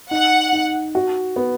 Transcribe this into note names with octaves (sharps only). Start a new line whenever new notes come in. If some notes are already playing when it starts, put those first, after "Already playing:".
D#4 F#5
D#4
F#4
B3